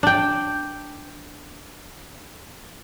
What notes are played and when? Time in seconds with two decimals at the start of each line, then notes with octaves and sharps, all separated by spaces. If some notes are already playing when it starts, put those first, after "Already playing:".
0.03 D4 G5